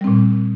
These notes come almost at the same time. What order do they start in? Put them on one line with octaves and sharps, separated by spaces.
G3 C4 A#2